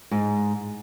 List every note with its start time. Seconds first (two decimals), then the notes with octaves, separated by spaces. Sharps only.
0.11 G#2